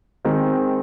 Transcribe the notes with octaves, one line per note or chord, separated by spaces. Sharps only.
D#3 G#3 C4 D#4